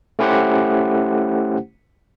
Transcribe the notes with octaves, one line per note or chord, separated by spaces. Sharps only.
A3 C#4 E4 G4 C5 F#5